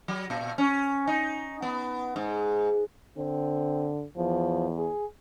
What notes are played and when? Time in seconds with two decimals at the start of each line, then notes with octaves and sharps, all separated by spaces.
0.08 F#3
0.30 A#2
0.58 C#4
1.07 D#4
1.62 B3
2.16 G#2
3.17 D3 C4
4.17 E2 F3
4.77 G#4